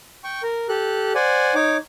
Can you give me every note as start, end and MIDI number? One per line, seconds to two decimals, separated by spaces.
0.24 0.42 79
0.24 0.42 85
0.43 0.67 70
0.69 1.13 67
0.69 1.13 69
0.69 1.13 90
1.15 1.54 72
1.15 1.54 74
1.15 1.54 78
1.15 1.54 80
1.55 1.77 63
1.55 1.77 73
1.55 1.77 86